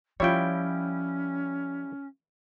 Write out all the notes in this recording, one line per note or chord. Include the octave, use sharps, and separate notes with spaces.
F3 G3 C#4 E4 F4 C#5 G5